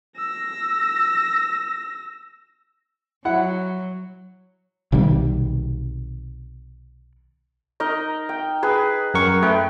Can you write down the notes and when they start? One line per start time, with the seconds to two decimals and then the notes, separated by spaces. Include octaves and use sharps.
0.17 E6 A#6
3.25 F#3 E4 F#5
4.92 B1 C3 D#3 G3
7.80 D#4 A#4 D#5
8.29 G5
8.63 G#4 B4
9.14 F#2 A#4 C#6
9.43 A3 B4 G5